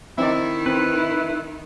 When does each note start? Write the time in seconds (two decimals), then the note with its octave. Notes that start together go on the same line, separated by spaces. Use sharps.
0.18 D#3 C4 D#4 E4 D5
0.66 C4 B4